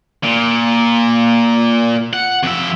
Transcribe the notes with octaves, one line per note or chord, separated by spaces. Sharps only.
A#2
F#5
F2 E5